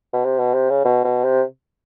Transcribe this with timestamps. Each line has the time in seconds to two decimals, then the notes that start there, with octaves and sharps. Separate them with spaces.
0.13 B2
0.25 C3
0.39 B2
0.54 C3
0.70 C#3
0.85 B2
1.05 B2
1.24 C3